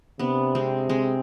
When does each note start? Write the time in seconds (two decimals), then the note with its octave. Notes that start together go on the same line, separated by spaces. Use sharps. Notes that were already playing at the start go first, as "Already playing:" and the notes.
0.19 C3 B3 D4
0.55 G#3 C4
0.89 G#3 C4